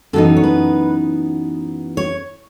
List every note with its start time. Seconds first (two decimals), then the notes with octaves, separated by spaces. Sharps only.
0.13 F#2 E3 B3 D#4 A4
0.37 C#5
0.44 B4
1.97 C#5